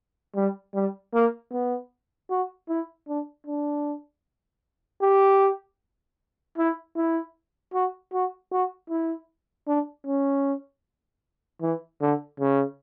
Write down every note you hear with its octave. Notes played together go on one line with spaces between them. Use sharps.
G3
G3
A#3
B3
F#4
E4
D4
D4
G4
E4
E4
F#4
F#4
F#4
E4
D4
C#4
E3
D3
C#3